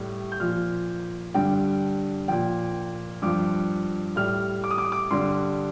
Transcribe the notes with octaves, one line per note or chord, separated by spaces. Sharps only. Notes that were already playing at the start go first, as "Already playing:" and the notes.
Already playing: A2 G3
G6
A#2 F3 F6
G2 D3 G3 G5
A#2 F3 G5
G2 F3 D6
A2 G3 F6
D6
D#6
D6
D#6
D6
G2 D3 G3 C6